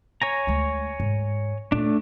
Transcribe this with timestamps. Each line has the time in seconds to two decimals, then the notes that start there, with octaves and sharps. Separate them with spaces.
0.22 C#5 G#5 A#5
0.47 D2 G#3
1.00 G#2
1.72 A#2 A3 D4